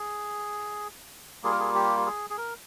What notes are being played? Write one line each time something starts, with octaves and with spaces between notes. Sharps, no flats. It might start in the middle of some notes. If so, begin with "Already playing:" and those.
Already playing: G#4
G3 A#3 F4 G#4
A#4
G#4
G4
G#4
G#4
A#4